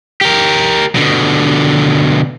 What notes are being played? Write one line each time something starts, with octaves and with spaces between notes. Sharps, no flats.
G4 A#4
B2 D3